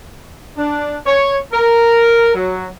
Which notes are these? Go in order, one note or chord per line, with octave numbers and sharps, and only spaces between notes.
D4
C#5
A#4
F#3